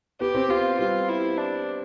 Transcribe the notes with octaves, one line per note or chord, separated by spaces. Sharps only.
B3 G4
C4
B3 F4
G3 F4
E4
D4